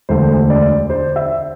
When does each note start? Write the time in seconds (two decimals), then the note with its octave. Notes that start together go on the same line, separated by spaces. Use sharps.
0.09 E1 D2 D3 C5
0.50 D5
0.90 C5
1.16 E5